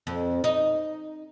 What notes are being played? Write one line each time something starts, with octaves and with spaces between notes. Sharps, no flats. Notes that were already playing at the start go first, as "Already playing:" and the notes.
F2
D#4